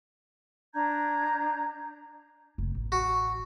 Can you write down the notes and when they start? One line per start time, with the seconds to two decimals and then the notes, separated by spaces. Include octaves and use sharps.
0.73 D4 A#5 G6 G#6
2.58 F1
2.75 A1
2.92 F#4